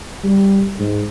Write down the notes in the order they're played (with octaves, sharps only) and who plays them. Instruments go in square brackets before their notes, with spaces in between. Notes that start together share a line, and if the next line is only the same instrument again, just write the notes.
[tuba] G3
G#2